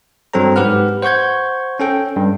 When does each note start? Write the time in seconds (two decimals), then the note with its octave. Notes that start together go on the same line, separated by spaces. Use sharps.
0.34 G2 F#3 C4 A4 C5 A#5
0.56 G#2 G4 B4 F#5 F6
1.02 C5 F#5 C#6 G6 G#6
1.80 C#4 A4 G5
2.16 G2